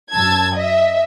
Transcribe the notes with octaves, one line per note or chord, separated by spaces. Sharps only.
F#2 A5 E6 G#6
D#5 E5